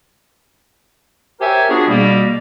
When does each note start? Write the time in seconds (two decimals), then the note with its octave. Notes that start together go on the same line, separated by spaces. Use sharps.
1.41 G4 A#4 C5 C#5 E5 G#5
1.69 B3 D4 F4 F#4 G#4
1.88 B2 G3 A#3